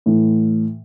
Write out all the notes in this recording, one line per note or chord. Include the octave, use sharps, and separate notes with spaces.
A2 E3 A3